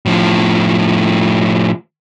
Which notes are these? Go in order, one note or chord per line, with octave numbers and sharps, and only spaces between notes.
A2 F3